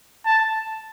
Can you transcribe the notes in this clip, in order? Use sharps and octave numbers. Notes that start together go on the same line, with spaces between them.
A5